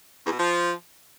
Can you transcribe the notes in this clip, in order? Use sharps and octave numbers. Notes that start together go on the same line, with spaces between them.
E2
B2
F3